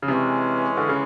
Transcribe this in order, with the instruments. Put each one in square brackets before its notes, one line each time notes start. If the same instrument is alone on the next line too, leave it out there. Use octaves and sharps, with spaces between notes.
[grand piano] C#3
[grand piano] C3 [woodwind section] E3 G#3 C#4
[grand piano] D3
C#3